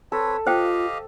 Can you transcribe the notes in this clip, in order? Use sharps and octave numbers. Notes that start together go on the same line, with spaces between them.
C4 A4 B4 C#5
F4 G4 C5 D#5 F5 G5